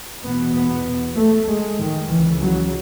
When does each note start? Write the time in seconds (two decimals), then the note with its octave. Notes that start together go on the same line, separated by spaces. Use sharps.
0.23 E2 B2 B3
0.55 B3
1.16 A3
1.47 G#3
1.79 D#3
2.09 C#2 C#3 E3
2.41 F#3